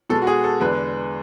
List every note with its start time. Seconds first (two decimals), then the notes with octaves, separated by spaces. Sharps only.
0.10 B2 G#3 A4
0.22 F#4
0.27 G#4
0.44 A4
0.60 E2 D3 G#3 B4